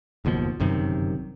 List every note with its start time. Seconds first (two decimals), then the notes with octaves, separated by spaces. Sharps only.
0.25 F#1 D#2 B2 F3
0.60 G1 F#2 C3 D#3